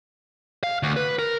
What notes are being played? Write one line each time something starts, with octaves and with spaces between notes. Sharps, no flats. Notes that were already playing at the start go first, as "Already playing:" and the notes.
F5
D2
B4
A#4